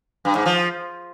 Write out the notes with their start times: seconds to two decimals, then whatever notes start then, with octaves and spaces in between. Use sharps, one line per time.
0.25 G2
0.35 G#2
0.46 F3